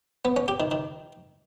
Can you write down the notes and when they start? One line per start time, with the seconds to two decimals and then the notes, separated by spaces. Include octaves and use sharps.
0.25 B3
0.36 C#4
0.48 G4
0.60 D#3
0.71 D#3